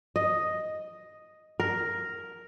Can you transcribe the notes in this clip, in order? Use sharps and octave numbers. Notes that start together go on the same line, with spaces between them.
D#5
A#4